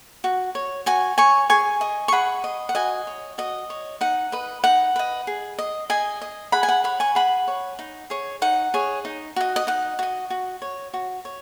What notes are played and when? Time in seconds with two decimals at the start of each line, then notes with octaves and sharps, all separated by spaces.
0.24 F#4
0.55 C#5
0.86 F#4 G#5 C#6
1.18 C#5 G#5 C#6
1.50 G#4 G#5 C#6
1.81 D#5
2.08 C#6
2.12 G#4 F#5 B5
2.44 D#5
2.69 F#5
2.75 F#4 D#5 G#5
3.07 C#5
3.38 F#4 D#5
3.70 C#5
4.01 D#4 F#5
4.32 B4 D#5
4.64 D#4 F#5
4.96 B4 D#5
5.27 G#4
5.59 D#5
5.90 G#4 D#5 G#5
6.22 D#5
6.52 G#4 F#5 B5
6.63 G#5
6.68 F#5
6.84 C#5 F#5 B5
7.00 G#5 C#6
7.15 G#4 F#5 B5
7.48 C#5
7.79 D#4
8.10 G#4 C#5
8.42 D#4 F#5
8.74 G#4 C#5
9.05 D#4
9.36 F#4 D#5
9.56 D#5
9.67 D#4 F#5
9.99 F#4 D#5
10.30 F#4
10.62 C#5
10.93 F#4
11.25 C#5